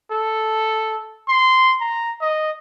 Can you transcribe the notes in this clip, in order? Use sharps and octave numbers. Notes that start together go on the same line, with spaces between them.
A4
C6
A#5
D#5